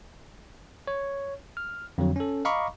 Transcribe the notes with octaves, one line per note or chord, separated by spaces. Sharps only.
C#5
F6
F2 D3 F#3
C#4 A4
D#5 F5 A#5 B5 C#6 D6